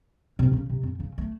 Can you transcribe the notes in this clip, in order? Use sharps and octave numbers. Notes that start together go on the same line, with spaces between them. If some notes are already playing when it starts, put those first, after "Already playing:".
D#2 C3
C#3 C#4
C3
F2
C#3
A3